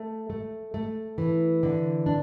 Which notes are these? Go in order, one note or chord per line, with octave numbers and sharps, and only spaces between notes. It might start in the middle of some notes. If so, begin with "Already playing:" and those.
Already playing: A3
A3
A3
E3
D3
D4